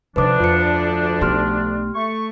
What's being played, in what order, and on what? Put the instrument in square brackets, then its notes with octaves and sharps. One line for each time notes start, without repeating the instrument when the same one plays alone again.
[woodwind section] D2 F3 D4 [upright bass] C3 D#3 [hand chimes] B4 D6
[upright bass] F2 [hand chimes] F4 C#7
[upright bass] B1 A3 [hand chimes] G4 C6 F6
[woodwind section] A3 C#6